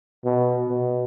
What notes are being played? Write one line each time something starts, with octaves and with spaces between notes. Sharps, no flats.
B2
B2